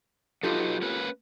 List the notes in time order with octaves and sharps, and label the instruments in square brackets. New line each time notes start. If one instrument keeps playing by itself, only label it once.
[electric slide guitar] F#3 D#4 B4 [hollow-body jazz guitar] F4 G4 A4
[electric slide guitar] A#3 C#4 B4